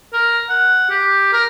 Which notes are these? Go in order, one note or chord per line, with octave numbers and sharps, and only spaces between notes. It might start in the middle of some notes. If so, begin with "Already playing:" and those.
A#4
F#5
G4
A#4